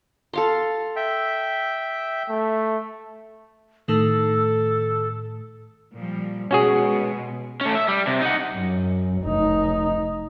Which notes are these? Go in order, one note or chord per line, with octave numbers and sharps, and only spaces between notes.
A4 F5 C6
E5 G5
A3
A2 D#3 A3 A4
A#2 F3 G3
B2 G#3 C#4 F#4 G#4
A3 C#4
E5
G3
C3
D#4 F#5
F#2
F1 D#4